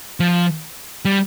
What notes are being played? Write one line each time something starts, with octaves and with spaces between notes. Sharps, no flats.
F3
G3